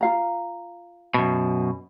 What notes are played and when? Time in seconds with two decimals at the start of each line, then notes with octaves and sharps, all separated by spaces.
0.01 F4 F5 A#5
1.14 F#2 B2